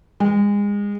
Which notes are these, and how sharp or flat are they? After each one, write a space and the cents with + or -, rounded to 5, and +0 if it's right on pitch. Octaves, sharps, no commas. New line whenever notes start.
G#3 -30